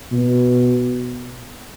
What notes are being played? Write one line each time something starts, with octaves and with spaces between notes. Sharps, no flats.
B2